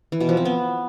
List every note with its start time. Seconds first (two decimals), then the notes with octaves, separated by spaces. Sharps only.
0.12 E3
0.21 B2
0.29 F3
0.37 C4
0.45 B3